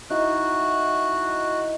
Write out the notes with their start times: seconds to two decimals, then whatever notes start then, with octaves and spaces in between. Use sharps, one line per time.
0.10 D#4 E4 F#4 E5 F#6